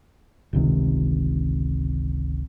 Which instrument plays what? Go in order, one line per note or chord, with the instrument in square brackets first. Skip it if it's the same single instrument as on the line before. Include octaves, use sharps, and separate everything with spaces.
[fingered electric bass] G1 C#2 C3 D#3